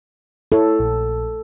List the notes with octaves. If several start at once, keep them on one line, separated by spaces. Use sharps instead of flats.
E4 A4 C#5
A#1